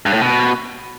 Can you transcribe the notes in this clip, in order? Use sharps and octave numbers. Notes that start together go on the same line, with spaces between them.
G2
A2
B2